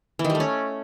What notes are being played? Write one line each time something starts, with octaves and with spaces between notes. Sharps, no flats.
E3
D#3
G3
A3
C#4